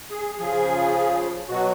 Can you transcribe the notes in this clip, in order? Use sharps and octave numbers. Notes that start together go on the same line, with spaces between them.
G#4
C#3 F3 G#4
B2 F#3 F#4